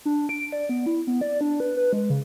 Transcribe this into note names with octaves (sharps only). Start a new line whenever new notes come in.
D4
D7
D5
B3
E4
B3
D5
D4
B4
B4
G#3
C#3